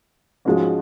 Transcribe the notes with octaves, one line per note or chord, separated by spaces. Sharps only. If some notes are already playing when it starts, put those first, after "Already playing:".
G#2 F3 G#3 C#4 F#4